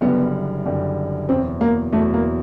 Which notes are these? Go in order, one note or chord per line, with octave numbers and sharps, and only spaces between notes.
F#1 F#2 D3 G3 B3
F#1 F#2 D3 G3
E2 B2 F#3 C4
A#3
E2 B2 F#3 A3
A#3